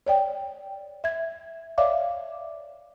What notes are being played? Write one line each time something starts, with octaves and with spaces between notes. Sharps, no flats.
C#5 D5 G5
E5 G#6
C#5 D5 E5 F5 D6